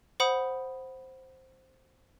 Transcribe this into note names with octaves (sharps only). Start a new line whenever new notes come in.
C5 F#5 B5 D#6